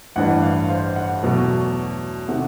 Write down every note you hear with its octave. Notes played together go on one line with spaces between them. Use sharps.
A1 G2 E3 F#5
F5
C5
F#5
E2 B2 F#3 A3
C3 D#3 F#5